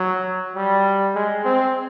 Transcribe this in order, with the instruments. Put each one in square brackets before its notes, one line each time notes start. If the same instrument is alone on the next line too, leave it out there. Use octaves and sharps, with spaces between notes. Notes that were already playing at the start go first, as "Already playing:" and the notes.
Already playing: [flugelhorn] F#3
G3
G#3
C4